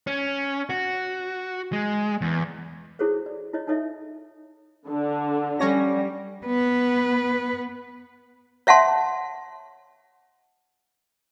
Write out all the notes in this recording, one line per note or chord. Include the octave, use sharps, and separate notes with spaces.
C#4
F#4
G#3
E2
E4 F#4 G#4 A4 C5 C#5
D5
E4 F4 C#5 D#5
D#4 E4 A4 C#5 D#5 E5
D3
G3 C#4 A#6
B3 B4
C#5 E5 F#5 A5 C6